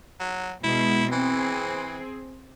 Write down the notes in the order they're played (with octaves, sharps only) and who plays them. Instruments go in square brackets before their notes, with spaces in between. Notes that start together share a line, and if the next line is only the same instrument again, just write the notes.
[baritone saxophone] F#3
[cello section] B2 G#3 [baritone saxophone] E4
[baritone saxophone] E3 [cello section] C4 G#4